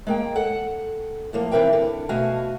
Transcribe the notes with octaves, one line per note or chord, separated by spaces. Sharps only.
G#3 A#3 G5
A4 F#5
A2 F3 A#3
E3 C4 A#4 B4 E5 G5
D3
B2 A3 F#4 F5 G#5